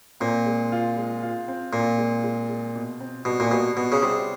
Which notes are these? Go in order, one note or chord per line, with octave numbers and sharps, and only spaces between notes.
A#2 C4
G#3
F4
G#3
F4
C4
A#2 F4
G#3
G#3
G#3
B2
C4
B2 G3
A#2
B2 G3
B2 B3
C#3
C3 G3